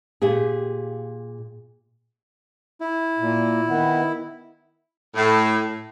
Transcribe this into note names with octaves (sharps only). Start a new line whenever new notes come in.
A#2 G4 G#4
E4
A#2
D#3 B3
A2